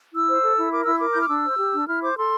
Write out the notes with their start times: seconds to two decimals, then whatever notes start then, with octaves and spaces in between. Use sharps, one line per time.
0.13 E4 E6
0.28 C5
0.42 A4
0.57 E4
0.71 A#4 D6
0.84 E4 E6
0.97 A#4 D6
1.14 E4 G6
1.21 F6
1.29 D4 E6
1.45 C5
1.58 G4
1.74 D4
1.88 E4 F6
2.02 C5 D6
2.18 A4 C6